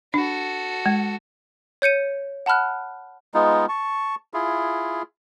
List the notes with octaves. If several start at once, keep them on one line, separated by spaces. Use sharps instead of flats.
D4 F#4 A4
G#3
C#5 G6 C#7 D#7
F#5 A5 B5 F6 F#6
G#3 B3 D#4 F4
A5 C#6
E4 F4 G#4